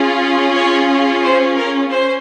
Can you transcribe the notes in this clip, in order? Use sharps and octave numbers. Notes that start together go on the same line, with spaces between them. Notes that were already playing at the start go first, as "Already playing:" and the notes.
Already playing: C#4 F4 G#4
C#5
C5
A#4
C#4 C5